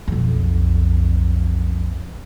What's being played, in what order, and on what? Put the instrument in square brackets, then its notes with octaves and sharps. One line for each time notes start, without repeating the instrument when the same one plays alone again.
[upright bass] B1 F2